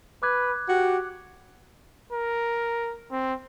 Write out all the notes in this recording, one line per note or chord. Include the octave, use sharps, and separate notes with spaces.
B4 D6 F#6 G#6
F#4 G4
A#4
C4